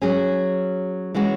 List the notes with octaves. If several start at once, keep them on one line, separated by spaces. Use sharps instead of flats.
F#3 C#4 G#4
E3 G#3 C#4 F#4